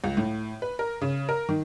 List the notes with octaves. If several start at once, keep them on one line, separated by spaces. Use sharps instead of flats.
C#2
A2
B4
A#4
C#3
A#4
D#3